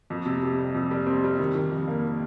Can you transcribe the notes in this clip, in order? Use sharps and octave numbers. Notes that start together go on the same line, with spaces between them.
F2
C3
C3
G3
F2
G3
C4
G3
D#3
D#3
F2
A#3